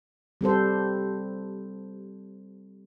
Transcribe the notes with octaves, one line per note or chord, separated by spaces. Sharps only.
G3 C4 A4 C5